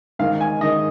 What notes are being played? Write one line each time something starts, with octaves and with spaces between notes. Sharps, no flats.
G#2 D#3 F5
G#5
G#2 D#3 D#5